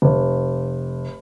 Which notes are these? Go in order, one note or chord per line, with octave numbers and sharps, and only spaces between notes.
F1